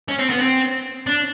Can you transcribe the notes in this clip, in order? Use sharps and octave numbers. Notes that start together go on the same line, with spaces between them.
C#4
C4
B3
C4
D4